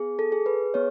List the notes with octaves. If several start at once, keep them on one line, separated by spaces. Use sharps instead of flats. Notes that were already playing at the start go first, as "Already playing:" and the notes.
Already playing: B3 G#4
A4
G#4
B4
B3 C#5